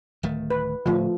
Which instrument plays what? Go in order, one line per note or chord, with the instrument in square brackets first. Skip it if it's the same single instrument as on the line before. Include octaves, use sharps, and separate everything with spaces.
[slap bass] D1 D#3 A3
[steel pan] B4
[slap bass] A2 D3 [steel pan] F3 A3